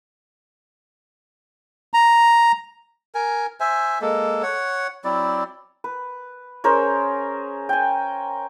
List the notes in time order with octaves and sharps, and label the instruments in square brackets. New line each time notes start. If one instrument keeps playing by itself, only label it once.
[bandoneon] A#5
[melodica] A#4 G#5
C5 E5 G#5
G#3 A#3 A4
C#5 F#5
F#3 C4 E4 D5
[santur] B4
C#4 G#4 A#4 C5
G5 G#5